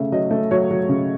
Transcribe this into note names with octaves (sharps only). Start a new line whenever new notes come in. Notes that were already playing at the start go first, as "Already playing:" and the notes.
Already playing: C#3 A3 E5
F#3 D#5
A3
F#3 C#5
F#3
C#3